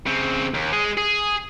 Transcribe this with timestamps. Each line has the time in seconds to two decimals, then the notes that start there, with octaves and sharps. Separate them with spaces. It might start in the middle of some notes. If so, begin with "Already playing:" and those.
0.06 C#3 C4
0.54 D#2
0.72 G#3 G#4
0.97 G#4